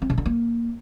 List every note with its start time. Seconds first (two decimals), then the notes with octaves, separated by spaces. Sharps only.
0.02 C4
0.10 C#3
0.18 D3
0.26 A#3